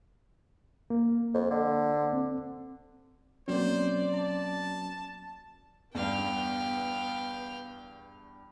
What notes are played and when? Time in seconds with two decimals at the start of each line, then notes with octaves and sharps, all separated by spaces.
0.90 A#3
1.34 F2
1.50 D3
2.13 C4
3.48 B2 F#3 A#3 C4 C#4 C5 D5
4.14 A5
5.95 E2 G2 B3 F5 G5